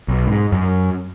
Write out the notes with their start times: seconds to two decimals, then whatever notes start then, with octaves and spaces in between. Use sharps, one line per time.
0.08 B1
0.27 G#2
0.52 F#2